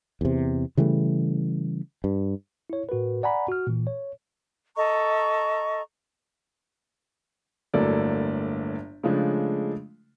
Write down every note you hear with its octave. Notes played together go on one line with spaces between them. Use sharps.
E2 C3
C#3 E3 G3 A3
G2
E4 C#5
A2 F#4 A#4 B4
D5 F#5 G#5 A#5 B5
F#4 F6
A#2 E3
C#5
A4 D#5 A#5 C#6
G1 A2 F#3 A#3 A4 D5
C#3 F3 G#3 A3 D4